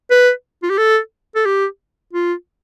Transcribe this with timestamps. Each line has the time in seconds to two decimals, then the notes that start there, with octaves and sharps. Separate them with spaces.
0.11 B4
0.63 F4
0.70 G4
0.78 A4
1.35 A4
1.46 G4
2.13 F4